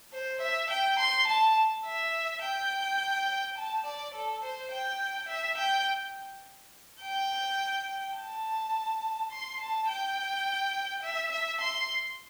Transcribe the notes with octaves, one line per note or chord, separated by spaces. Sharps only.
C5
E5
G5
C6
A5
E5
G5
A5
D5
A4
C5
G5
E5
G5
G5
A5
C6
A5
G5
E5
E5
C6